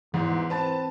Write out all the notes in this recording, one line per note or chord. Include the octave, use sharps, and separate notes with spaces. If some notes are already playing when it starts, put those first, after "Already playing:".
E2 G#2 E3
C4 B4 A5 A6